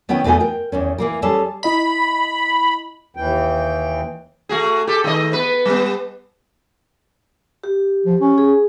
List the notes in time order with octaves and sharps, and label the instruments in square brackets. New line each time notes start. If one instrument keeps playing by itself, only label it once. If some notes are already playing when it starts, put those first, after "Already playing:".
[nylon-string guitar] D#3 B3 C#4 E4 G5
E2 A3 B3 D#4 F#4 G#5
A#4 G5
E2 D#3 C#4
E3 A#3 A#4
G3 C#4 G#4 A4
[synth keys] E4 D#5 A#5 [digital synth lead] B5
[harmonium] D#2 E3 G5
[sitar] A3 F#4 G#4
G4 A4
D#3 A3 D#5
B3 B4
G3 B3
[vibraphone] G4
[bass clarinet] F3
C#4
[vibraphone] G#4